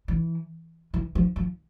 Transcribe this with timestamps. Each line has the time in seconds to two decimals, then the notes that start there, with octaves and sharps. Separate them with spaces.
0.08 E3
0.94 E3
1.15 F3
1.36 F3